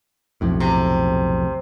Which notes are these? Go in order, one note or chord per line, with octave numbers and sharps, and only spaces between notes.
B1 F2 A2
C3